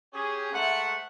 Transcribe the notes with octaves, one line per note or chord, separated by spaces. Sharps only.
C#4 G4 G#4
G#2 A3 E5 F#5